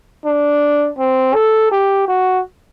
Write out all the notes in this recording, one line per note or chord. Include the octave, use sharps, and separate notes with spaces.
D4
C4
A4
G4
F#4